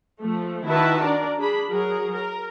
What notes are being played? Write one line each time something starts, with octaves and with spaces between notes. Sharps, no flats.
F3 A3
D#3 E4 F#4 B4 E5 A5
D4 A#4 D5
D4 G#4 B5
F#3 G#4 A#4
A#4